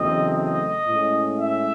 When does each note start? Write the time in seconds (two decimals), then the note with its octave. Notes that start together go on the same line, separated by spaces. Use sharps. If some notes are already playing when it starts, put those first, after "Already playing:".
Already playing: E2 C#3 F#3 A3 C4 D#5
0.32 D#5
0.86 A2 G#3 C#4
1.39 E5